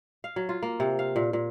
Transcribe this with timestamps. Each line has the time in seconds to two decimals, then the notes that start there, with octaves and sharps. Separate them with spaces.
0.24 F5
0.36 F#3
0.49 F4
0.63 A#3
0.80 C3
0.99 F5
1.16 A#2
1.33 A#2